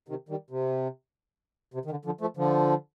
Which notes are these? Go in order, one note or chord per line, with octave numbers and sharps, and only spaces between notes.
C3 D#3
D#3 G3
C3
C3
D#3
D3
D3 F3
F3 A3
D3 F3